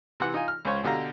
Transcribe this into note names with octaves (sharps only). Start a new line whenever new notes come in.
C3 E3 F#5
D#4 F4 G#5
F6
C#2 C#4 F4 C5 C#5
B2 D3 G4 F5 A#5